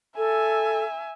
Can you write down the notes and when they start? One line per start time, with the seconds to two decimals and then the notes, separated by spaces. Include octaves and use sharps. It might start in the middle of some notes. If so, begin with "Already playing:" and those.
0.17 A4 E5 G#5